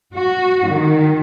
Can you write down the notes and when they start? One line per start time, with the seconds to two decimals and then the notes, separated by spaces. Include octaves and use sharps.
0.15 F#4
0.69 D#3